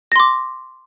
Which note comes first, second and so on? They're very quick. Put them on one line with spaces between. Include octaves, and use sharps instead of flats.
A#6 C6 D6